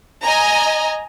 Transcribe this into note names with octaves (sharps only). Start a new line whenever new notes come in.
D#5 G#5 A#5